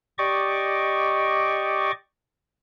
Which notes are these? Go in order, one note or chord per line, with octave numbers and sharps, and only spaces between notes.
G4 D5 D#5 C#6 D6